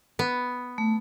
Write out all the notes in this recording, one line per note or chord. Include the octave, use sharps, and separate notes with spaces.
B3
A3